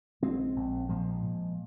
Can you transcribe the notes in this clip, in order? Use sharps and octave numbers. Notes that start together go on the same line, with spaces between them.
A#1 G#3 C4
A#1
A#2 F3 G#3
A#2